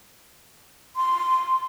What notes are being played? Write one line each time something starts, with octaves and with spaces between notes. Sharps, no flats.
C6